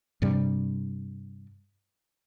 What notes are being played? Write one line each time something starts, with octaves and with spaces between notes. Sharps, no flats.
G2 C3 G3